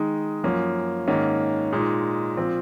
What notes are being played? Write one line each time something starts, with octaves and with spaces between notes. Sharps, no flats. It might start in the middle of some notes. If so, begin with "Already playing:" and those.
Already playing: D#3 G#3 D#4
F#2 F3 A#3 C#4
G#2 D#3 A#3 C#4
A#2 G#3 D#4
A#2 F3 C4